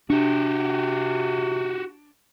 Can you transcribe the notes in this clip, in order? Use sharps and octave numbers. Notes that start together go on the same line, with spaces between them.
C3 D4 F#4 G4